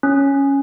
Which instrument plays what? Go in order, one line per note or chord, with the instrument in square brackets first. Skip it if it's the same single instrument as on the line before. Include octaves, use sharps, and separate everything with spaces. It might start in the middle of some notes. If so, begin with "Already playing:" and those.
[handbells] C#4